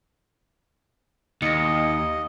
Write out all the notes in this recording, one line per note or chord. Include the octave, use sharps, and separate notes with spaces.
D#2 D#5 A#6 C#7